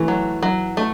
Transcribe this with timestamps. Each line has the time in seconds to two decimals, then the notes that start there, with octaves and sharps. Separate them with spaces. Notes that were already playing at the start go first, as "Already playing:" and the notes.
Already playing: E3 A3
0.08 F#3
0.43 F#3
0.77 A3